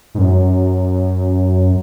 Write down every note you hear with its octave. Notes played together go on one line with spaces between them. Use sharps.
G#2
F#2